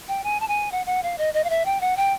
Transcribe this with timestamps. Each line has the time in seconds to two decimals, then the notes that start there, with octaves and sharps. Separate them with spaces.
0.08 G5
0.24 G#5
0.40 A5
0.48 G#5
0.72 F#5
0.86 F#5
1.03 F5
1.18 D#5
1.34 D#5
1.44 F5
1.50 E5
1.65 G5
1.81 F#5
1.97 G5